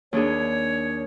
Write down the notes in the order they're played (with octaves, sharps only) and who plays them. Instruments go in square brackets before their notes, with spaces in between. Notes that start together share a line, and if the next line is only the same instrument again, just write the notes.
[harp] D#2 D4 G#4 [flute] C#5